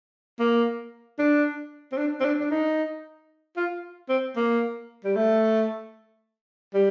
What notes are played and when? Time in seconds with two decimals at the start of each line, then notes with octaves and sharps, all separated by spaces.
0.40 A#3
1.19 D4
1.92 C4
1.97 D4
2.20 C4
2.24 D4
2.40 D4
2.51 D#4
3.57 F4
4.09 C4
4.36 A#3
5.04 G3
5.16 A3
6.74 G3